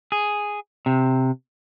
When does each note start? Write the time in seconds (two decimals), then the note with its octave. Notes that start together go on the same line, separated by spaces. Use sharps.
0.12 G#4
0.86 C3